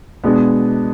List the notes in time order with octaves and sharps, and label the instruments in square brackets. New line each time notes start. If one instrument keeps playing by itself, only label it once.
[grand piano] B2 G#3 B3 D4 G#4